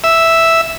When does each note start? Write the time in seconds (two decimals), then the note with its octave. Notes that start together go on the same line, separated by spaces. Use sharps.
0.04 E5